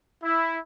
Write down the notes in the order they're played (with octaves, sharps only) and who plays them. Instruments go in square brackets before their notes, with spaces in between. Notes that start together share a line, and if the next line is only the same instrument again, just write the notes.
[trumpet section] E4